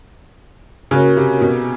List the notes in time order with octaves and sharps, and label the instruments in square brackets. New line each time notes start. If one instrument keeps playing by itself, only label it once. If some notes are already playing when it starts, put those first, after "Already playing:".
[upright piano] C#3 [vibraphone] C#4 F#4 A#4 C#5
[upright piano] C3
B2